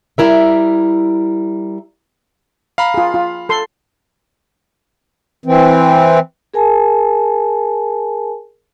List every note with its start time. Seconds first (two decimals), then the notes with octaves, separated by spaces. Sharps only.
0.18 G3 E4 A#4 E5
2.78 F5 A#5 B5
2.94 F4 G#4
3.14 F4
3.49 A4 C6
5.46 E3 C4
6.54 G#4 A#4 G#5 A5